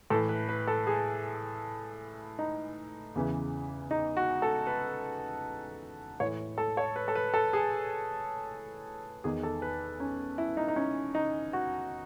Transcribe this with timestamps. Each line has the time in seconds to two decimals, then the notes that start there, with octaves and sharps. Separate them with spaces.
0.10 A2 E3 A4
0.29 B4
0.49 B4
0.68 A4
0.87 G#4
2.39 D#4
3.15 E2 C#3 E3
3.91 D#4
4.17 F#4
4.42 A4
4.67 B4
6.20 A2 E3 C#5
6.58 A4
6.77 C#5
6.96 B4
7.08 A4
7.15 B4
7.34 A4
7.53 G#4
9.24 E2 D#3 G#4
9.43 A4
9.62 B4
10.00 C#4
10.38 E4
10.57 D#4
10.68 D#4
10.76 C#4
11.15 D#4
11.53 F#4